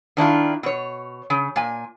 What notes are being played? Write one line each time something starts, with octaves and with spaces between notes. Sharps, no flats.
D#3 D4 E4 F4
B2 C#5
C#3
A#2 G#5